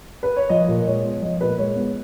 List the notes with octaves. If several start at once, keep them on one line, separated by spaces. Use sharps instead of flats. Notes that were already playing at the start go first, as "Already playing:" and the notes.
B4
C#5
F3 D#5
A#2
G#3 C#5
B3
F3 D#5
A#2 B4
G#3 C#5
B3